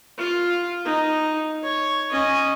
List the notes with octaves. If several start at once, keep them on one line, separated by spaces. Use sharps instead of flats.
F4
D#4
C#5
C#4 D#5